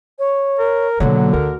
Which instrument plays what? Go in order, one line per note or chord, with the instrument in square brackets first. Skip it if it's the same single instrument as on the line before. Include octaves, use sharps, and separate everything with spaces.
[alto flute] C#5
[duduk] A#4
[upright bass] B2 A#3 [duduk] D3 [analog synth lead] F#3 [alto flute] F#4
[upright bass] D2 [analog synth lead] A#4